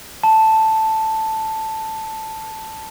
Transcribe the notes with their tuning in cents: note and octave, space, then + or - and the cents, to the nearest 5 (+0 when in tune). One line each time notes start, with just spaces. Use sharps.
A5 +5